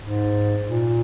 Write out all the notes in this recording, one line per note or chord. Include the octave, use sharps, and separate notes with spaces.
G#2
A#2